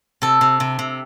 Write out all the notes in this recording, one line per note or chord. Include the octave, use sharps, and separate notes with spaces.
C3 A4
C3
C3
C3